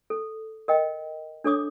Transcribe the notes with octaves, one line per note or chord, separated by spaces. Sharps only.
A4
A#4 D#5 G5
D4 A4 C#5 D6 D#6